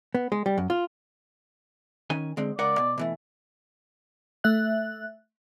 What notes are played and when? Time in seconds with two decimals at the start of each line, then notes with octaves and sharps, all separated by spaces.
0.15 B3
0.32 G#3
0.46 G3
0.58 F#2
0.70 F4
2.10 D#3 C#4 G#5
2.37 D3 G#3 C4
2.59 C#2 A#4 D5 F#5
2.78 B2
2.98 B2 E3 A3
4.44 A3 E5 F#6